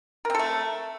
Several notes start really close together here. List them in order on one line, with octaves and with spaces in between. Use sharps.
A#4 C4 A4 A3